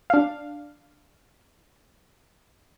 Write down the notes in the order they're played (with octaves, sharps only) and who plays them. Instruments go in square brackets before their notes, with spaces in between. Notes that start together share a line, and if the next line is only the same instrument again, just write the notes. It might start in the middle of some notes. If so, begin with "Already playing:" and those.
[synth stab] D4 F5